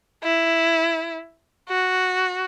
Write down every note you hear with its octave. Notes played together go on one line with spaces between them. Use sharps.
E4
F#4